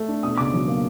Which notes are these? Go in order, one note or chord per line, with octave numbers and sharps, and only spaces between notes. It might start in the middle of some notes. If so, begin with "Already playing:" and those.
Already playing: A3
D4
B2 D#6
C#2 D6
F#3
A#3